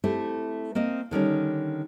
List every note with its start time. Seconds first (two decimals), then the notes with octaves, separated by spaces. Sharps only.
0.04 A3 C4 E4 G4
0.75 A#3 C4 D#5
1.11 D3 D#3 G3 C#4